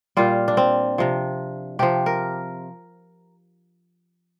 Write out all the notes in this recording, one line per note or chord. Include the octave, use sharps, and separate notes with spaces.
A#2 G3 F4
D4
C4
C3 F3
C3 F3 G4
A#4